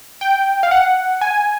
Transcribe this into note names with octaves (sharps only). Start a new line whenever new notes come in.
G5
F5
F#5
G#5